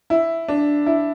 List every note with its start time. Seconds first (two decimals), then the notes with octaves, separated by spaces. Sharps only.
0.10 E4
0.48 D4
0.86 E4